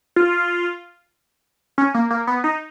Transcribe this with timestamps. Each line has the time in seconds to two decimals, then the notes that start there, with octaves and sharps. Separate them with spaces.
0.16 F4
1.78 C#4
1.94 A#3
2.11 A#3
2.27 B3
2.44 D#4